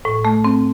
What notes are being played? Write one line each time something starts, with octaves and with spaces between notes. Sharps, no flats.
A2
A3
C4